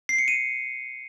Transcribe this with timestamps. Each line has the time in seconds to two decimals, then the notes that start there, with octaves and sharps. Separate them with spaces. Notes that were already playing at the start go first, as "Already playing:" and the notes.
0.09 C7
0.18 C#7
0.28 D#7